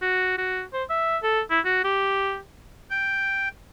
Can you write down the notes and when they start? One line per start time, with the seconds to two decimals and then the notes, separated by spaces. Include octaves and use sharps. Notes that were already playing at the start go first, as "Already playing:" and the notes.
0.01 F#4
0.38 F#4
0.73 C5
0.89 E5
1.23 A4
1.50 E4
1.65 F#4
1.84 G4
2.91 G5